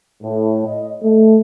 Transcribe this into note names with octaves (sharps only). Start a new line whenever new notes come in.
A2
D#5
A3